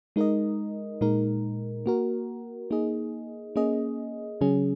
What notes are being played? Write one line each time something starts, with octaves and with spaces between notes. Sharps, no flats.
G#3 D#4 A#4 D#5
A#2 G#3 D#4 A#4
A#3 F#4 A#4
A#3 D#4 G#4 D#5
A#3 C#4 G#4 D#5
C#3 F#3 C#4 G#4